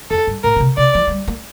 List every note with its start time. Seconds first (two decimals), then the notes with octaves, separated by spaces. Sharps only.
0.10 F2 A4
0.27 G2
0.44 A2 A#4
0.56 D3
0.60 C3
0.77 C3 D5
0.95 F3
1.07 A3
1.11 G3
1.28 A#3